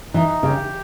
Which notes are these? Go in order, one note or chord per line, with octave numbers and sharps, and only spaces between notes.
E3 D#4
C#3 G4